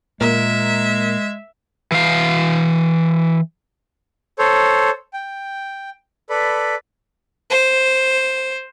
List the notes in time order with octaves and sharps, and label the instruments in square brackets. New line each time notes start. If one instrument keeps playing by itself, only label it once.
[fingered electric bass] A#2 [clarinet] G#3 [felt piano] A#3 A#4 [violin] E5
[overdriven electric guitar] E3 F5
[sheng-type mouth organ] A4 C5 C#5
G5
A4 B4 D5 B5
[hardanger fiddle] C5